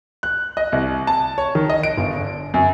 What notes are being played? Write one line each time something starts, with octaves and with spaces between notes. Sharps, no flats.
F#6
D#5
C2
A5
C#5
D#3
D#5
D7
G1
D3
F#2